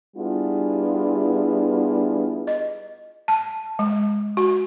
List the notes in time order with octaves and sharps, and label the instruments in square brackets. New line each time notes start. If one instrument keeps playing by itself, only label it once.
[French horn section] G3 B3 D4 E4 F4 G#4
[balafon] D#5
A5
G#3
F#4